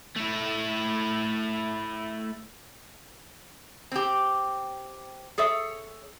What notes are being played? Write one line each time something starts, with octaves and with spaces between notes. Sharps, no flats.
A3 E4
C4 G4
G#4 A4 C#5 E5